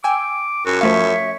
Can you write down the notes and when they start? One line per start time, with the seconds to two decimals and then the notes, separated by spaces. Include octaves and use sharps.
0.04 G5 G#5 D6 E6
0.66 F#2 F#4
0.81 F3 A3 C#5 E5 F5